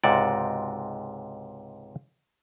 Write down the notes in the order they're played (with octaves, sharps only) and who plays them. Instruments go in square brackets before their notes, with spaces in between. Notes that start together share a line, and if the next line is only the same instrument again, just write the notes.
[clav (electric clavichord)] C#2 G#2 C3 F#4 D5